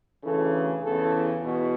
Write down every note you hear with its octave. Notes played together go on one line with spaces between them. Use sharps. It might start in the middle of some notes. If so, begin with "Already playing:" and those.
D2 C#3 E3 A4
E2 C#3 E3 A4
E2 B2